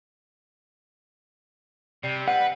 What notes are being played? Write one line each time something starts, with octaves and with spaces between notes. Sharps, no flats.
C3 G3
G3 B4 F#5